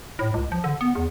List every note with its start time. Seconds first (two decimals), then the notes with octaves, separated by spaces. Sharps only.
0.19 A2
0.34 C#2
0.52 F3
0.64 D3
0.81 B3
0.95 E2